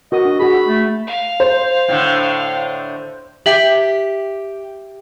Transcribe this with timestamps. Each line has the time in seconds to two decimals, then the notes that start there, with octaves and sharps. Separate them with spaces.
0.12 F#4 A#4 D#5 D#6
0.25 D4
0.40 F#4 G#4 B5
0.54 E6
0.67 A3
1.07 F5
1.40 C5
1.88 A2 D3
3.46 G4 E5 F#7